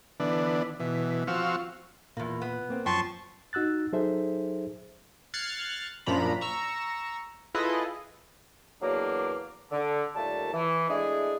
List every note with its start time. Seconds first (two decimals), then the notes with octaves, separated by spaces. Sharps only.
0.20 D3 E3 B3 D4
0.80 B2 E3
1.27 F3 C4 F#4 F5 C#6 E6
2.17 E2 A#2 A#3
2.42 B3
2.70 A#3 C4
2.86 F#2 F3 G5 A5 C6 C#6
3.53 D#4 F#4 E6 F#6 A6
3.93 F#3 D#4 G#4 A4 C5 E5
5.34 F6 F#6 G#6 A6 C7 C#7
6.06 F#2 A#2 F3 D4 A#5 B5
6.41 A#5 C#6 E6
7.54 E4 F4 G#4 A4 B4 D#5
8.82 E2 F#3 A#3 D4
9.71 D3
10.15 D#2 A#2 G3 A3 A5
10.53 E3
10.89 G#3 A3 D4 E4 G#4